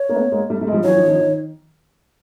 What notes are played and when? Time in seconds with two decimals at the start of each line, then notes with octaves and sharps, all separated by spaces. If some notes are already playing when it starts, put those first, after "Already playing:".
Already playing: C#5
0.09 A#3
0.14 A3 B3
0.32 G#3 A#3
0.49 G3 A3
0.61 G3 A3
0.67 G#3
0.73 F3 G3
0.84 E3 F#3 C#5
0.96 D#3 F3
1.08 D#3 F3
1.19 D#3